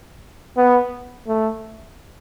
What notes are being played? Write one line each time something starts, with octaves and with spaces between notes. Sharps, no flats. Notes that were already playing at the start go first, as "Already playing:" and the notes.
B3
A3